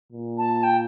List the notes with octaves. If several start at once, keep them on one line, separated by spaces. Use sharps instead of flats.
A#2
A5
G5